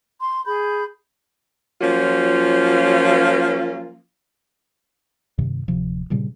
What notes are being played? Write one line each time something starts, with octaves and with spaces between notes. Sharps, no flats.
C6
G#4 B5 G6
F3 F#3 A#3 C#4 F4
G2 C3 D#3
D1 C3 F3
G2 A#2 C#3 G3